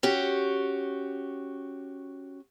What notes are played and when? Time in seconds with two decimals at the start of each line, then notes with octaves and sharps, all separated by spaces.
0.03 C#4 F#4 G4